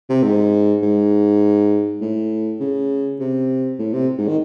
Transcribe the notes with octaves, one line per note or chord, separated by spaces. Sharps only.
C3
G#2
G#2
A2
C#3
C3
A2
C3
G#2
D#3